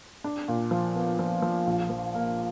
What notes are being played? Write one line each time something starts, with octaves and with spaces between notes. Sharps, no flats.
D4
A#2
F3
B3
F3
F3
A#1
F3
A#3